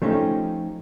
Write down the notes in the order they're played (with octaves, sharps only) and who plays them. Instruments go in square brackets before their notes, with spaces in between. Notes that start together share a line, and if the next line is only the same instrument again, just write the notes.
[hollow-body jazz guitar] F3 A3 C#4 D#4 G4